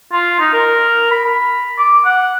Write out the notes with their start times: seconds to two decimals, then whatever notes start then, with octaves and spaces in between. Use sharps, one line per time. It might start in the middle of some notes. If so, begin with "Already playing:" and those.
0.12 F4
0.40 D#4
0.53 A#4
1.11 B5
1.78 D6
2.05 F#5